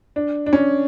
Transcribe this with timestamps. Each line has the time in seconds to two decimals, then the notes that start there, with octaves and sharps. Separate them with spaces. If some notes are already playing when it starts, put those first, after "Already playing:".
0.16 D4
0.46 D4
0.53 C#4